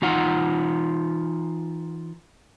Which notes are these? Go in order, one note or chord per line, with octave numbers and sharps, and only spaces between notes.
E3 D#4 F4 F#5 A#5